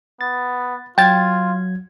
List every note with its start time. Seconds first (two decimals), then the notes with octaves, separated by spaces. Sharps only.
0.21 B3 A6
0.98 F#3 F4 G5 G#6 A6